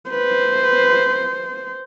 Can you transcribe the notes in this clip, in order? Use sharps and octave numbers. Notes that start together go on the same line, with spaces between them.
B4 C5
B4